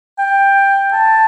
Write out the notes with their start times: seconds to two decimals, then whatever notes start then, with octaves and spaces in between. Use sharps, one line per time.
0.19 G5
0.93 A5